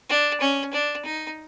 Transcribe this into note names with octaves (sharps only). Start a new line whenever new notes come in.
D4
C#4
D4
D#4